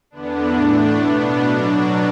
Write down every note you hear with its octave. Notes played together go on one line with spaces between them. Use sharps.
E2 D3 B3 D4
A2 A3 D4
B2 B3 D4
B2 F#3 D4